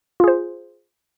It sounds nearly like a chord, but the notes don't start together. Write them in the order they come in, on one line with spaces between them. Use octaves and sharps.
F4 G#4 C5